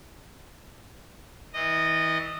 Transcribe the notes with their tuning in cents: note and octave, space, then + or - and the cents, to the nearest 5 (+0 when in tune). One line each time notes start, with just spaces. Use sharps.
E3 -35 D#5 -15